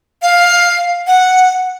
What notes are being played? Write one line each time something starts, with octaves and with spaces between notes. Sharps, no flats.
F5
F#5